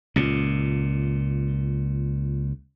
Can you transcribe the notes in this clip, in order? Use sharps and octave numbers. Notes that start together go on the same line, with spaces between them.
C#2 A#2